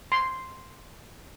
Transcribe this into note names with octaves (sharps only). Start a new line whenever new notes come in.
C6